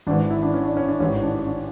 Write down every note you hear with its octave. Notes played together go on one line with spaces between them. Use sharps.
G#1 G#2 E3 D4
E4
D4
C#4
D4
C#4
D4
A1 G#2 E3 C#4
D4
D4